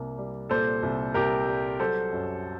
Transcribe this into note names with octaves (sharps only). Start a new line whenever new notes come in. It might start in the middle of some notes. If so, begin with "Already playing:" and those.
Already playing: C2 C3 A#3
G3
A#2 A4 C5
C2
C2 G4 A#4
G3
F#3 A4 C5
F#2